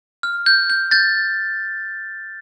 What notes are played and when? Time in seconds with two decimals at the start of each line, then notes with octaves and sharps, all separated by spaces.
0.23 F6
0.46 G6
0.70 G6
0.91 G6 A6